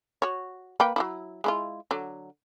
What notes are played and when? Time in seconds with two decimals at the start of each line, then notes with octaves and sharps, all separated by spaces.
0.22 F#4 C#5
0.80 A#3 B4 G5
0.96 F#3 D#4 E4
1.44 G#3 E4 F4
1.91 D3 F#3